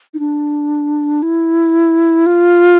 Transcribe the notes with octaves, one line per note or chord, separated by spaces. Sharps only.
D#4
D4
E4
F4